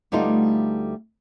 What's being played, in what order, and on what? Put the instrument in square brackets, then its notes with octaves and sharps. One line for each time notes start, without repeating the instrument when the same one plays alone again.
[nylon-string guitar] D2 G3 A3 B3 D#4 F4